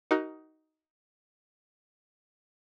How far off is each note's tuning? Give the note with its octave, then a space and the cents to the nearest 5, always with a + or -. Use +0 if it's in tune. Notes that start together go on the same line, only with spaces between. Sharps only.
D#4 +10 F#4 +30 A#4 +0